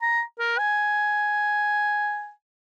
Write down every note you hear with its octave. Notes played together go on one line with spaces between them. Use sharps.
A#5
A#4
G#5